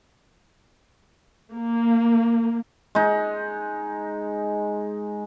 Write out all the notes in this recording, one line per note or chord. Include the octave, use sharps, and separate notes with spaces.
A#3
G#3 D#4